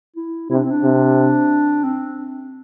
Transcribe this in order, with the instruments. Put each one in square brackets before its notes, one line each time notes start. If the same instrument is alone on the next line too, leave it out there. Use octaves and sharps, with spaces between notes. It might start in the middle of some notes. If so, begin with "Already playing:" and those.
[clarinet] E4
[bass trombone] C3 [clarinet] E4
[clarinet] D4
C4
D4
[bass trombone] C3
[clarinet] C4